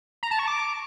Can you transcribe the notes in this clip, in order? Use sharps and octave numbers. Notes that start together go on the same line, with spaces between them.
A#5
A5
C#6
D6